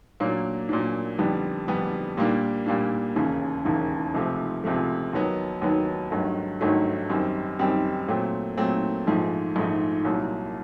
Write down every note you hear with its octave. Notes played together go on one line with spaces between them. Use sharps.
A#2 F#3 A#3 D4
A#2 F#3 A#3 D4
F2 D3 G3 B3 D4
F2 D3 G3 B3 D4
A#2 G3 A#3 D4
A#2 G3 A#3 D4
E1 D#2 C#3
E1 D#2 C#3
C#2 C3 F3 A3
C#2 C3 F3 A3
D#2 D#3 F#3 B3
D#2 D#3 F#3 B3
G#1 G2 D#3 F#3 A3
G#1 G2 D#3 F#3 A3
F#2 D#3 G3 C4
F#2 D#3 G3 C4
A#2 F#3 A3 C4
A#2 F#3 A3 C4
A#1 G#2 F3 A3
A#1 G#2 F3 A3
C2 A#2 F#3